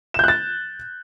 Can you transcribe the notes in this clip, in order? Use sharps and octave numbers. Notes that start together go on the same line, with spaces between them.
F#6 G6 A6 E7